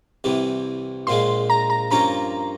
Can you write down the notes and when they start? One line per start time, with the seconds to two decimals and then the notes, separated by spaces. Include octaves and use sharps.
0.24 C2 C3 E3 G3
1.07 A#1 A#2 F3 G#3 C6
1.50 A#5
1.70 A#5
1.91 G2 F3 A#3 C#4 F4 A#5